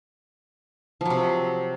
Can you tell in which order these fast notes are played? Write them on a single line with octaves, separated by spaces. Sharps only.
F3 F#3 C3